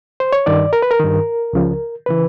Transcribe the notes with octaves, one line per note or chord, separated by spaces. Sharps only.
C5
C#5
G2 D#3 D5
A#4
B4
A#4
G2 D#3
C#2 C#3 F3
C#3 E3 B4